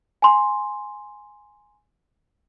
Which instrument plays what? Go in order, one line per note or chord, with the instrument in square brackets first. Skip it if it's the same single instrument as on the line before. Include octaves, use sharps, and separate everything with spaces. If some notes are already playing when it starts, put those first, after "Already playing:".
[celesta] G#5 A#5 C6